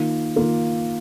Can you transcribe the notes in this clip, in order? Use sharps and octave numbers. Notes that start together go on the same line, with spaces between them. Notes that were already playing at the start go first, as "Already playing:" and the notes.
Already playing: D#3 A#3 F4
D#3 A#3 F4